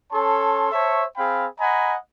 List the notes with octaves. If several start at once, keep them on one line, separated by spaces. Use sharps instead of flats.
C#4 A4 C#5 A5 C6
C5 C#5 E5 A5 C#6
C4 G#4 F5 G5 B5
D#5 F#5 G#5 A#5 B5